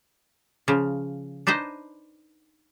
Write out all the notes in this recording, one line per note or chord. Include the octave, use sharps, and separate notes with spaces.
C#3 F3
D4 D#4 B4 C5 D#5